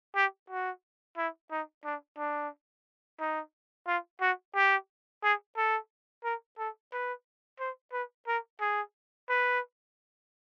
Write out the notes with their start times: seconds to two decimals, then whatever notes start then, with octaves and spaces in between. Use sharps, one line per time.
0.15 G4
0.50 F#4
1.17 E4
1.51 D#4
1.85 D4
2.18 D4
3.19 D#4
3.87 F4
4.21 F#4
4.55 G4
5.23 G#4
5.57 A4
6.24 A#4
6.58 A4
6.92 B4
7.60 C5
7.92 B4
8.27 A#4
8.61 G#4
9.29 B4